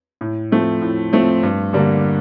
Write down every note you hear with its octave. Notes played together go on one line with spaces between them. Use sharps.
A2
F3 A3 C4
A2
F3 A3 C4
G2
D3 G3 A#3